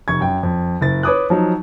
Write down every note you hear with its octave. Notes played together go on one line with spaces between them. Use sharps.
F1 C#6 G#6
F#2 G5
F2
F#1 A6
B4 C#5 D6 D#6 F#6
F3 F#3 D#4